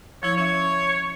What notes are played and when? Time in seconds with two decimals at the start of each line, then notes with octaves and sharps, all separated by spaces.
0.23 F3 E4 C#5 E6
0.37 C#4 C#5 E5